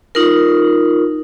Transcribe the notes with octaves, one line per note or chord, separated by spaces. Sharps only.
D#4 F4 A#4